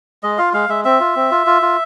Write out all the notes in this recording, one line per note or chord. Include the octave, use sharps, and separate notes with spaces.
G#3 D#5
F4 F5
G#3 F5
G#3 E5
C4 E5
F4
C4
F4
F4
F4